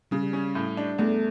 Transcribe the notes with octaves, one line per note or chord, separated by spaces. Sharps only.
C#3 G3
C#4
A2
D4
E2 A3